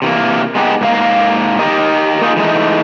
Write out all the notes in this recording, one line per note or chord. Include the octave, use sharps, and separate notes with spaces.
C3 E3 A#3
G#3 B3 D#4 F4 G4
G#2 A#3 F5
D#4 G4 A#4 D#5
A#3 D#4 F4 G#4
E3 G#3 A3 D#4